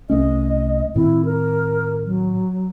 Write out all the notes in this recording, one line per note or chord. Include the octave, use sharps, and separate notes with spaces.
C2 A3 C#4 D#5
A2 D#3 C4 E4
A#4
F#3